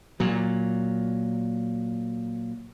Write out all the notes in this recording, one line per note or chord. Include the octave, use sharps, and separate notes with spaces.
A#2 F#3